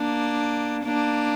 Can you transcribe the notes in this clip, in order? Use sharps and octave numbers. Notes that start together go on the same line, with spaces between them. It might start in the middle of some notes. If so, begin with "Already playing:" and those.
Already playing: A#3 D4
A#3 D4